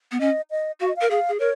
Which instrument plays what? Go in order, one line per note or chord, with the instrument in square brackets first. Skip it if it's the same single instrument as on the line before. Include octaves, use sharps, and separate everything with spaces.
[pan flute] B3
[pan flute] C#4 [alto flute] D#5
[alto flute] D#5
[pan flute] F#4 [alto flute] F5
[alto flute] D#5
F5
[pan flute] A#4
[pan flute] G#4 [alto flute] F5
[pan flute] G#4
[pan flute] A#4 [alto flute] C#5